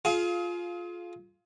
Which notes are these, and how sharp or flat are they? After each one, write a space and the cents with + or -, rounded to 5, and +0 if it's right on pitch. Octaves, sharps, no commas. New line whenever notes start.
F4 +5 G#4 +35 F5 +0